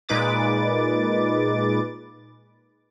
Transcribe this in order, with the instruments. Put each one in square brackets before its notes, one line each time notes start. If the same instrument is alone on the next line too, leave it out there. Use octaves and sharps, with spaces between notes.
[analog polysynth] A#2 G#3 D#4 B4 D6 A6